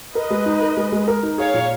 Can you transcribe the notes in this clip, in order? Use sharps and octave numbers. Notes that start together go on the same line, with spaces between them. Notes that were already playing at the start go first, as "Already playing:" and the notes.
A#4 B4 D#5
G#3
D#4
A#4
G#3
G#3
A#4
D#4
G#4 C#5 F5
A#2